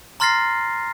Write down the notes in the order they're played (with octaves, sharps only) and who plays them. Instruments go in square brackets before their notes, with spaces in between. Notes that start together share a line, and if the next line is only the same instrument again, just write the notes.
[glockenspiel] A#5 C6 F6 A6 A#6 C7